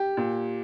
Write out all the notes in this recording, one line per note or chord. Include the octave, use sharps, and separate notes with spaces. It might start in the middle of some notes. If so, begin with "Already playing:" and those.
Already playing: G4
A#2